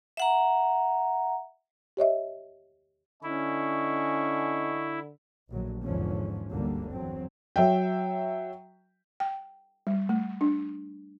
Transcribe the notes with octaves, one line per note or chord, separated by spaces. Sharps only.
E5 F#5 A#5
G4 C#5 D#5 E5
D3 C#4 E4 D#5 G#5 C#6
A#1 A2 D3 F#3
E2 G#2 D3 F3 C#4
G1 D2 D3 G3 A#3
E2 F#3 C4
F#3 E5 G5
G5
G3
A3
D4